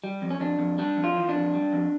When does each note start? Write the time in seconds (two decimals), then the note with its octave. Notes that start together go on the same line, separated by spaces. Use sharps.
0.04 G3
0.22 F2
0.30 C#4
0.40 F2 D4
0.59 F2
0.78 G3 D4
0.97 F2
1.04 F4
1.16 E3
1.29 D4
1.34 F2
1.54 G3
1.73 F2